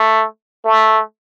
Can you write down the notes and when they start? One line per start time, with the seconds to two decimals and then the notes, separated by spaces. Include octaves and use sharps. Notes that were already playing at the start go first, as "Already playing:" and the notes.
Already playing: A3
0.65 A3